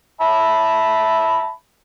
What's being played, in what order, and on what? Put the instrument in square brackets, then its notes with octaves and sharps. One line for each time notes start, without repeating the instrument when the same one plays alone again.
[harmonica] E5 A5 B5